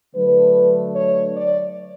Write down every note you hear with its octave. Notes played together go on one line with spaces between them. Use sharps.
D3 F#3 A3 D4 B4
C#5
D5